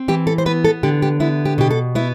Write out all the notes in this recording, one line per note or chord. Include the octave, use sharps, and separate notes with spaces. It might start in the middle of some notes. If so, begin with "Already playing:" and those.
Already playing: C4
E3 G4
A4
C5
B3 B4
A4
D3 G4
G4
B3 E4
G4
B2 G4
A4
B3 E4